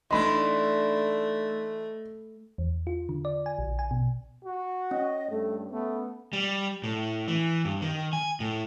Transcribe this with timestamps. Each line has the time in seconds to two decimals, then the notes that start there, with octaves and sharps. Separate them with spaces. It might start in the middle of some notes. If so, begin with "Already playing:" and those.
0.11 E3 A3 D4 D#4 D#5 B5 C6
2.58 E2
2.87 F4
3.09 D3
3.25 D5
3.46 G#5
3.58 A#1
3.79 G#5
3.91 B2
4.44 F#4
4.91 C#4 D#5
5.31 G2 A3
5.70 A3 B3
6.33 G3
6.84 A2
7.28 E3
7.65 G2
7.82 D#3
8.13 G#5
8.40 A2